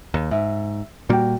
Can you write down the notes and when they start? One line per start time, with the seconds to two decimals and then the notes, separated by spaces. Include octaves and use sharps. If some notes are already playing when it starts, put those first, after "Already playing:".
0.14 D#2
0.31 G#2 E5
1.09 A#2 G3 A#3 F#4 G5